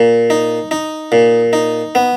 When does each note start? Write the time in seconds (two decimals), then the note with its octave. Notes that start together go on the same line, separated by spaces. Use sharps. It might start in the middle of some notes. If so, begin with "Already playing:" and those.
Already playing: A#2
0.30 D#4
0.71 D#4
1.12 A#2
1.53 D#4
1.95 B3